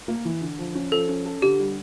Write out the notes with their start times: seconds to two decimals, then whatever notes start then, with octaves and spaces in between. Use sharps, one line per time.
0.08 A#3
0.25 E3
0.41 D3
0.59 F3
0.75 C#4
0.92 F3 A4
1.09 C#4
1.25 A4
1.42 D3 G4
1.59 G3